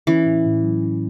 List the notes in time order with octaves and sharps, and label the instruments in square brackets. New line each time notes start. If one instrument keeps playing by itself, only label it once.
[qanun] E3 [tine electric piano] C#4
[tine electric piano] A2
A2
F#3
C#4